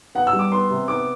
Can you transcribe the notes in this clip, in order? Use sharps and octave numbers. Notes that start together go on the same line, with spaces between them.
B3 F#5
E6
G3
D6
B3 C6
C3
B3 D6